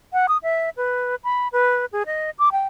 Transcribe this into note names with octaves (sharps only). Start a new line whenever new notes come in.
F#5
D#6
E5
B4
B5
B4
G#4
D#5
D6
G5